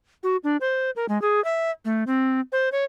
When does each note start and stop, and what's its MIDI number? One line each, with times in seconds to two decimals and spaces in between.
0.23 0.37 66
0.44 0.57 62
0.61 0.91 72
0.96 1.06 70
1.09 1.21 56
1.22 1.43 68
1.44 1.71 76
1.85 2.04 57
2.07 2.40 60
2.52 2.72 72
2.72 2.84 73